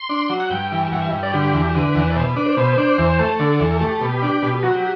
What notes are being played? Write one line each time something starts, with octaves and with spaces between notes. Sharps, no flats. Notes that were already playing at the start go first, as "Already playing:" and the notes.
Already playing: C6
D4
F#3
F#5
G2 G5
E3
G2 F#5
E5
G2
D5
D3 G4
E2
D3 B4
E2
D5
B2 C5
D4 B4
C5
B2
D4
E2
A3
D3 A4
E2
A3 G4
B2
D4
B2
F#3 F#4
G4